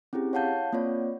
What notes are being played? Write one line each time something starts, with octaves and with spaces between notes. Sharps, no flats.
C4 C#4 E4 G4 G#4
C#5 F5 F#5 A5 G6
A#3 C4 F4 C#5 D5